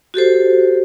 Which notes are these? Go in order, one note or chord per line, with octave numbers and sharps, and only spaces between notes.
F#4 G4 A4 C5